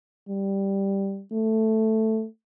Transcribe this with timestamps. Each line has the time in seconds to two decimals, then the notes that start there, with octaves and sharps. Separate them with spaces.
0.29 G3
1.33 A3